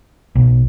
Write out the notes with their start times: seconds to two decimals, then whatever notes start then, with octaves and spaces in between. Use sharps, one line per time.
0.35 B1